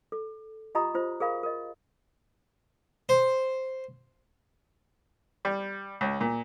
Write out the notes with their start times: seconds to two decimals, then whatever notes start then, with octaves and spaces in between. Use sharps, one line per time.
0.12 A4
0.75 F4 G4 D#5 A#5 B5 D#6
0.94 F4 C5
1.20 G#4 A#4 F5 B5
1.43 A#4 D#5
3.09 C5
5.45 G3
6.01 C#2
6.21 A#2